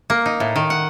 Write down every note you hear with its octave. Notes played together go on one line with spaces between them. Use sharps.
A#3
D#4
A2
D#3
F#5